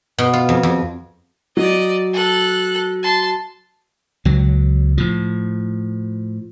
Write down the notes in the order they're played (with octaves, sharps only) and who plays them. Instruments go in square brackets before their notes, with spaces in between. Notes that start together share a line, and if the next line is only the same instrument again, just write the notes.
[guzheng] B2
F4
F2
F2
[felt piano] F#3 [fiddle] D5 D#5
[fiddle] A4 F#6
A5 C6
[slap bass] C#2 F#3
A2 F3